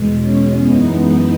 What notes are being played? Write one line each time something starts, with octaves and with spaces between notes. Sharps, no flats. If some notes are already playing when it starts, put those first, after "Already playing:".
Already playing: E2 B2 G#3
C#4
F#2 E3 G#3 B3 D#4
B3 D#4